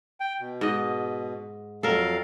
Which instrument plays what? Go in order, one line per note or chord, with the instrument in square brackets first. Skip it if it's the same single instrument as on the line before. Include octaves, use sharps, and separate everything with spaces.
[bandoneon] G5
B2
[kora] G#2 D#5
[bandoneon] F2 F#3 F5 [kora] A4 A#4